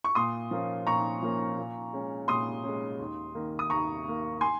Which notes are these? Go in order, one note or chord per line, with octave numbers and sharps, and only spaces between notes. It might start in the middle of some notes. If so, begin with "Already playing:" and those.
C#6
A#2 C6 D#6
F3 A#3 C#4
A#2 A#5 C#6
F3 A#3 C#4
A#2
G#3 C#4
A#2 C6 D#6
G#3 C#4
D#2
D#3 A#3
D#6
D#2 A#5 C#6
D#3 A#3
G#5 C6